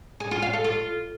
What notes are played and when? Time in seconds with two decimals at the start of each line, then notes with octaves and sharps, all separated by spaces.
0.20 G#4
0.31 F4
0.42 F5
0.53 A4
0.64 F4